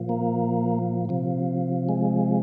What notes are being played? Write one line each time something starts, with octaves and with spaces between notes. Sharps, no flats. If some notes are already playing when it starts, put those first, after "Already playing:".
Already playing: A#2 F3
A#3
C3 F3
G#3